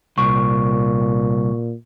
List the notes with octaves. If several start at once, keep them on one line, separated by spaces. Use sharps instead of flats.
C2 A#2 C#6